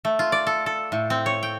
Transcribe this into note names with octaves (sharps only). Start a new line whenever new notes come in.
A3
F4
D5
A4
A4
A2
C4
C#5
G5